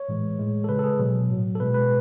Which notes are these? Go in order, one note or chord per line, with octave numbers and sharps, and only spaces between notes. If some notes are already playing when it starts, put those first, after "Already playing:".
Already playing: C#5
A2 E3 G#3
A2 G#3
A4
C#3 G#3 B4
A4
G#4
B2 F#3
A2 F#3
A4
B2 G#3 B4
B4